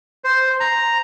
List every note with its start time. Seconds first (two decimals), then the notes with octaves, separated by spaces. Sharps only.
0.24 C5
0.60 A#5